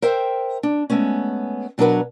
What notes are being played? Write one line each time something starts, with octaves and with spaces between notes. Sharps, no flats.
A#4 C5 E5 G5
D4
G#3 A3 B3 C#4
B2 F#3 D4 A#4 B4 F#5